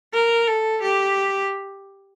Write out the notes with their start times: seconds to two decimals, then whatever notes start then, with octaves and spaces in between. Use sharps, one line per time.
0.13 A#4
0.47 A4
0.82 G4